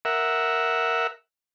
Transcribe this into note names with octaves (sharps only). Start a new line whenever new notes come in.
A#4 E5 F#5